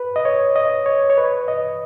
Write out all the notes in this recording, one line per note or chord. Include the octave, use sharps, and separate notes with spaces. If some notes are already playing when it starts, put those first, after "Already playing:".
Already playing: B4
D#5
C#5
D#5
C#5
C#5
B4
D#5